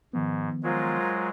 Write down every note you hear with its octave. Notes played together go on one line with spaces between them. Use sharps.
G#2 D#3 F3 B3
F#3 G#3 F4 A#4 C5